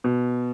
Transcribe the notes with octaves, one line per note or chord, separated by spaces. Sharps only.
B2